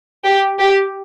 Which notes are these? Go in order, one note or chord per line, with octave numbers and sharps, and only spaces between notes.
G4
G4